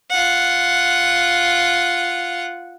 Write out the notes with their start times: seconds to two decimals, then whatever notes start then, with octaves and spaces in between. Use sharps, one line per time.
0.10 F4 F#5